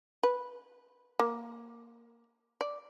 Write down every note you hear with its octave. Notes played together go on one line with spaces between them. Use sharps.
B4
A#3
D5